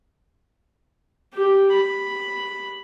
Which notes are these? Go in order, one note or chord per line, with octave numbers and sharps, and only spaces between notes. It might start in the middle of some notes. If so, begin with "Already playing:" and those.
G4
B5